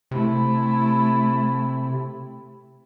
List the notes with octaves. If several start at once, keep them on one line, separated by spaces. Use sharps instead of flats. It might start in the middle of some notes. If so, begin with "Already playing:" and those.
C3 A3 E4